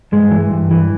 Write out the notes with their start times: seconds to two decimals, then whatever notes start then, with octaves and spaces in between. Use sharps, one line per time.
0.12 G2 G#3
0.31 E3
0.51 G2
0.71 E3